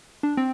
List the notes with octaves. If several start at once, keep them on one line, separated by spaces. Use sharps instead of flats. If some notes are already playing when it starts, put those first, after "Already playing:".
D4
C4